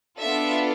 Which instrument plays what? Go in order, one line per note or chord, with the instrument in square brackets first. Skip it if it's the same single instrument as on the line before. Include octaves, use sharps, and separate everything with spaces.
[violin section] B3 D4 F4 A4 E5